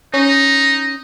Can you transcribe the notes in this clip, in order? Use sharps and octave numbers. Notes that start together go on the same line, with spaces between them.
C#4 D#4